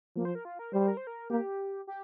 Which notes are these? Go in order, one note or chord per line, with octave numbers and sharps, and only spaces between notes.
F3 A#3
C5
A#4
F4
A#4
G3 C5
A#4
C5
A#4
A#3 G4
G4